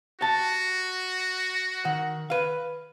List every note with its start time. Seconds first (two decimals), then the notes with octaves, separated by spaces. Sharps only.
0.21 F#4 G4 A5
1.85 D#3 F#5
2.30 B4 F5